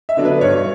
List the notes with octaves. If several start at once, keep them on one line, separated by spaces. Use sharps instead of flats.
E5
D3 F#3 B3 D4
B4
G2 C#5